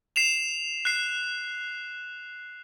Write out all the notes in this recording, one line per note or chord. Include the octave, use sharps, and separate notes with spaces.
C7 E7 F7
F#6 C7